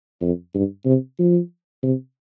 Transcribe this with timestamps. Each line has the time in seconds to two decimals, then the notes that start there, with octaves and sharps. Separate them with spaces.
0.21 F2
0.54 G2
0.86 C3
1.19 F3
1.83 C3